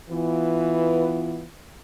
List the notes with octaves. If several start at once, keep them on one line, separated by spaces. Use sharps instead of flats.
E3 B3 F4